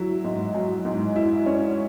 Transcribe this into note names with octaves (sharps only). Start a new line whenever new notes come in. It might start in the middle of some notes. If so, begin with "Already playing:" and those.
Already playing: F#3 E4
G#2
F#3
G#2
E4
C#4